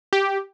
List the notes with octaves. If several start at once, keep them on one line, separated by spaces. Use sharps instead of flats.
G4